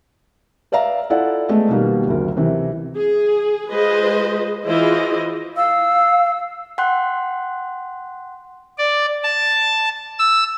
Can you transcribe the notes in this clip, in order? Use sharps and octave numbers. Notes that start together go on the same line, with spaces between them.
B4 D5 E5 F5 A#5
E4 F4 A4 D5 F#5
G#3 A3 B3
B2 D#3 G3 A#3
F#1 D2 A#4
C3 E3
G#4
G#3 F4 G#4 B4 C5 D#5
E3 E4 F4 G#4 C5 D#5
F5 E6
F#5 G5 C6 F#6
D5
A5
E6